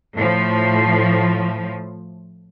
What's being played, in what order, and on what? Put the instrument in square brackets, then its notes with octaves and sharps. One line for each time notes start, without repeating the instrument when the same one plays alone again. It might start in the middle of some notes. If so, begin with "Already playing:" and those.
[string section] A2 F3